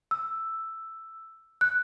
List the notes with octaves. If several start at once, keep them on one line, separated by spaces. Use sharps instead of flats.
E6
F#6